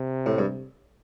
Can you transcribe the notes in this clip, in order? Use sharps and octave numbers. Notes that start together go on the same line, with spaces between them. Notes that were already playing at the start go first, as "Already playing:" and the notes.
Already playing: C3
A2
G2